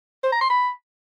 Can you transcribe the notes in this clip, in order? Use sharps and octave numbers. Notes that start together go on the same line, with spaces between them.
C5
A#5
C6
B5